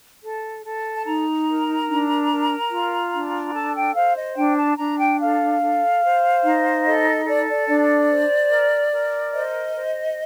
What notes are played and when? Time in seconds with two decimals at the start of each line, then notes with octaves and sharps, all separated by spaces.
0.21 A4
0.63 A4
0.96 A5
1.04 D#4 A#5
1.46 A#4
1.87 D4
2.29 A#4
2.70 F4
3.12 D4
3.53 A4 A5
3.74 G5
3.94 C5 F5
4.16 D#5
4.36 D4 G5
4.57 A5
4.78 D4 A#5
4.98 G5
5.19 A4 F5
5.60 A4
6.03 C5
6.43 D#4
6.85 A4 D#5
7.26 A4 D5
7.50 D5
7.68 D4 D5
8.10 C5
8.50 A#4
8.92 A#4
9.33 C5 D#5
9.74 C5